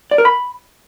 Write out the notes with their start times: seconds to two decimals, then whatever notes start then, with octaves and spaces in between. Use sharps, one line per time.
0.11 D5
0.18 A#4
0.25 B5